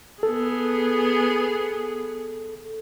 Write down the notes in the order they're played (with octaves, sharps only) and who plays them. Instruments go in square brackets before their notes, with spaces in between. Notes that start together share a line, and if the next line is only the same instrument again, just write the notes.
[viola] B3 G#4 [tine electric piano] A4